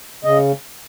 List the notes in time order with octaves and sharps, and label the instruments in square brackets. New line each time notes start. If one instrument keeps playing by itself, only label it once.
[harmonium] C#3 D#5